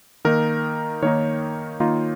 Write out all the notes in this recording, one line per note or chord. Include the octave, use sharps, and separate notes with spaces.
D#3 A#3 D#4 A#4
D#3 A#3 D#4 C#5
D#3 A#3 D#4 F4